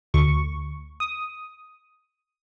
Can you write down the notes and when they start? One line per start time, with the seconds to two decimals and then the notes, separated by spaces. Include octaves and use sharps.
0.14 D2 C#6
1.00 D#6